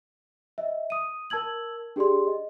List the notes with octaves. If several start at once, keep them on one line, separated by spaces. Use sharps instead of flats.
D#5 E5
D#6 D#7
A#4 A5 E6 G#6 F#7
D4 G4 G#4 D5 C6
D#5